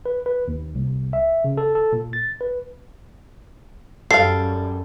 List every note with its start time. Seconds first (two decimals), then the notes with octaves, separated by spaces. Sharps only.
0.06 B4
0.26 B4
0.48 D#2
0.75 C2
1.13 E5
1.44 C#3
1.57 A4
1.75 A4
1.93 A#2
2.13 A6
2.41 B4
4.11 F#2 G3 A4 F5 C7